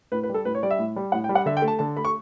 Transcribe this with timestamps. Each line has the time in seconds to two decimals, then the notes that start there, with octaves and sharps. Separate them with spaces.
0.12 A2 B4
0.23 B4
0.29 G3
0.34 A4
0.45 A2 B4
0.55 C#5
0.63 G3 D5
0.70 E5
0.79 A2
0.96 G3
1.12 A2 F#5
1.24 G5
1.29 G3
1.35 F#5
1.46 D3 E5
1.57 G5
1.62 A3
1.68 A5
1.79 D3 A5
1.96 A3 B5
2.05 C#6